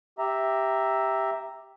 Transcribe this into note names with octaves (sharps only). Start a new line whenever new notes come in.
G4 E5 A#5